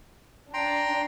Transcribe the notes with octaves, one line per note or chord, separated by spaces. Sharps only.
D4 G5 A#5 C6